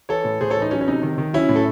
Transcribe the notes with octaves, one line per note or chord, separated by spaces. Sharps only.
E3 A4 C#5
A2
A2 G#4 C5
A4 C#5
E3
D#4
F#3 C#4
C#4
C3 D#4
D#3
D#3
F#3 C#4 E4
A2
A4